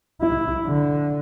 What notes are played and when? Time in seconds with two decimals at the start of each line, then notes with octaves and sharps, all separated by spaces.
0.21 E4
0.65 D3